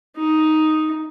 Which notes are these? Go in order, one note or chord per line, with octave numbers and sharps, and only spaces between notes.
D#4